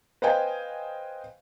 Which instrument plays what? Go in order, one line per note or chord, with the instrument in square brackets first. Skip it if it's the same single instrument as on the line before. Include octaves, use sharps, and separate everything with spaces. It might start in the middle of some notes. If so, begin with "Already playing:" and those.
[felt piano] B4 C5 D#5 F5 G5 G#5